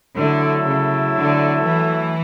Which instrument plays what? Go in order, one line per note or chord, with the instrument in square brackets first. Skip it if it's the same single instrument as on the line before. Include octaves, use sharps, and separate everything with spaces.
[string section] D3 [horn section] F#3 A3 E4 A4
[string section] C#3
D3
E3